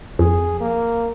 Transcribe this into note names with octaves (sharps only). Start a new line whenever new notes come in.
F2 G#4
A#3